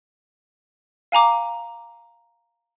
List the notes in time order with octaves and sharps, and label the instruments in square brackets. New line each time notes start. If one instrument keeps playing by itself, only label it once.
[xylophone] F5 G#5 A#5 D6